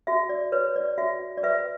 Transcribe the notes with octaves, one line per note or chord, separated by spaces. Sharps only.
F#4 E5
D5
B4 C#5
D5
F#4 E5
D5
B4 E5